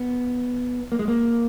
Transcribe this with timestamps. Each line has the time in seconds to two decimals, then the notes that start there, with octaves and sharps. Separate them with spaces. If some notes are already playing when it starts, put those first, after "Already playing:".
Already playing: B3
0.92 A#3
0.99 G#3
1.08 A#3